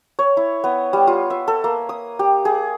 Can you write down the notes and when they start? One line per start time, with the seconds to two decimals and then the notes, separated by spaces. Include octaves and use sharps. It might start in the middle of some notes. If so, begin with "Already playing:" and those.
0.19 C#5
0.37 E4
0.64 B3
0.93 G3
1.07 F4
1.30 E5
1.48 A4
1.64 A#3
1.89 D#6
2.19 G4
2.45 G#4